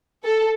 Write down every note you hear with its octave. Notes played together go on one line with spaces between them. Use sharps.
A4